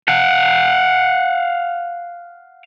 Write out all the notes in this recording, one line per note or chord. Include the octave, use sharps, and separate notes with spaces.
F5 F#5